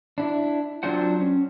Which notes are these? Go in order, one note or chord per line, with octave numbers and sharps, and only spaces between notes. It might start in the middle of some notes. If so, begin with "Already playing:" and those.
D4 E4
F#3 C4 D4 F4 C5 F#5
C#4